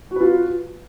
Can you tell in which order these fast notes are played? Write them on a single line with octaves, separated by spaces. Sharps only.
F#4 B4 F4